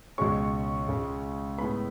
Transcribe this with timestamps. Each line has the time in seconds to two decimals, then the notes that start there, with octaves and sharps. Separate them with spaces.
0.18 C#2 B2 G#3 C#4 C#6
0.88 C#2 C#3 G#3
1.58 A2 G#3 B3 B5